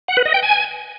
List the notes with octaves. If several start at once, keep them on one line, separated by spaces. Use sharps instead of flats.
F#5
B4
D#5
G5
G#5